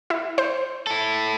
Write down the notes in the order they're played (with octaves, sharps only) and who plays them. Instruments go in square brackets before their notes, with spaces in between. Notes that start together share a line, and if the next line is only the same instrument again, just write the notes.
[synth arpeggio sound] E4
C5
[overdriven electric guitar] E4 A4